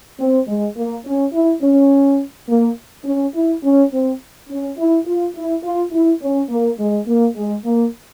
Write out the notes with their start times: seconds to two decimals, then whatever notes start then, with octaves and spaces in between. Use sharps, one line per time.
0.19 C4
0.47 G#3
0.76 A#3
1.05 C#4
1.33 E4
1.61 C#4
2.48 A#3
3.05 C#4
3.34 E4
3.63 C#4
3.91 C4
4.49 C#4
4.78 E4
5.06 F4
5.35 E4
5.63 F4
5.92 E4
6.21 C#4
6.49 A#3
6.78 G#3
7.07 A#3
7.35 G#3
7.65 A#3